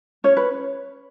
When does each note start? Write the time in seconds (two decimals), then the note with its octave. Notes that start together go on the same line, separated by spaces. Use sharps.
0.24 C#4 C#5
0.37 B4